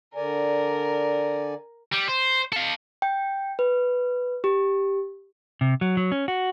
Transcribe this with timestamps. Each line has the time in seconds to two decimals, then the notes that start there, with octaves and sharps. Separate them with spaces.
0.15 D3 A#4 D5 G#5
1.92 G3
2.08 C5
2.53 A4 F5
3.02 G5
3.59 B4
4.44 G4
5.61 C3
5.81 F#3
5.97 F#3
6.12 C#4
6.28 F#4